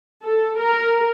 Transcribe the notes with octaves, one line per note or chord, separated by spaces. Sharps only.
A4
A#4